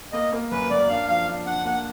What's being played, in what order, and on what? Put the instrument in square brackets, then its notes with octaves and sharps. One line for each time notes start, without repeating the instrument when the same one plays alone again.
[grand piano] A#3 [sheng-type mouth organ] D#5
[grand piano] A#3
[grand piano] F#2 [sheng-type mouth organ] B4
[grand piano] F#2 [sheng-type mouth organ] D5
[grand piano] D4 [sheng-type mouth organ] F5
[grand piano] F3 [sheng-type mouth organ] F5
[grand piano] D4
[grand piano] D4 [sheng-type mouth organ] F#5
[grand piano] A#3 [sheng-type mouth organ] F#5